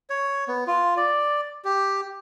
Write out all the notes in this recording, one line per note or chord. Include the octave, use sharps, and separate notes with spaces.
C#5
B3
F4
D5
G4